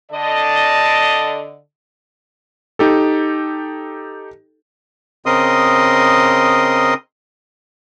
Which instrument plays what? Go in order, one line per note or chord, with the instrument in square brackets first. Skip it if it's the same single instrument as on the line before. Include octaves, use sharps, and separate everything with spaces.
[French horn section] D3 D5 D#5 [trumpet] A5
[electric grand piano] D#4 G4 A4
[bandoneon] C#3 C4 A#4 D#5 C6 D#6